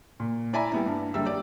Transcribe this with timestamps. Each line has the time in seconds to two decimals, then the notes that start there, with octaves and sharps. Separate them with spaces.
0.20 A#2
0.53 E4 D5 E5 G#5 A#5 B5
0.72 G3 B3 E4
0.86 G2
1.14 F#1 D3 G3 A#3 E5 E6
1.25 G4 D5